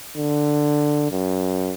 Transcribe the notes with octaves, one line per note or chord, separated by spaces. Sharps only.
D3
F#2